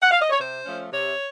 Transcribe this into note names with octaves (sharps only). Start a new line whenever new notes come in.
F#5
F5
D#5
C#5
C3 C5
F3 A3 C#4
C3 C#5